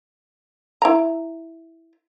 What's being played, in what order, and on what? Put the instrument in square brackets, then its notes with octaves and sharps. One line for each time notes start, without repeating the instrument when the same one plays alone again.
[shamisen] E4 A#5